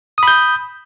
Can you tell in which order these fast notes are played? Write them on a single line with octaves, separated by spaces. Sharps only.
D#6 B5 G6